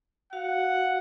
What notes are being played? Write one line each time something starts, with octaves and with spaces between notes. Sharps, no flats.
F#4 F5 F#5